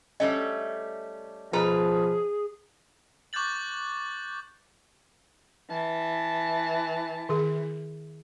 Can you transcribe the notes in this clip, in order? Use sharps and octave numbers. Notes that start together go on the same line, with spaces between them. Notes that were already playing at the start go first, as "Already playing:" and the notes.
G3 A3 C#4 D#5
B2 F3 G#4 B4 A#5
C#6 D6 F#6 G6 A6 F#7
E3 A5
D#3 G#4